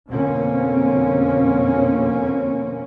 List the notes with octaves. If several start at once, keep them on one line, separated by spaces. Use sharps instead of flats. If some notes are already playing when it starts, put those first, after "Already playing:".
F2 B2 D3 A#3 C4 C#4